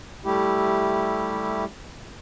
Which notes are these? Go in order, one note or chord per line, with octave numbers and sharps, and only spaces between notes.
G3 A3 E4 G4